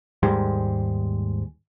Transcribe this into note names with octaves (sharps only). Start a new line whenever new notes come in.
D#2 G#2 G3 G#3